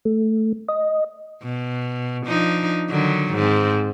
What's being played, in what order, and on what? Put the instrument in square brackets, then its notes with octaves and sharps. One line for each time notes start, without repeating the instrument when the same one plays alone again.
[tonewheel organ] A3
D#5
[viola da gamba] B2
F3 D4 D#4
D3 D#3 F#3
G#2 C4